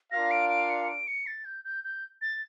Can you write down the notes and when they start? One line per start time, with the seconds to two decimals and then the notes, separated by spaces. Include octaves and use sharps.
0.11 D4 F4 A#4 D5 F5 A#6
0.31 D7
0.50 D7
0.70 C#7
0.89 D7
1.07 C#7
1.27 A6
1.45 G6
1.64 G6
1.84 G6
2.22 A6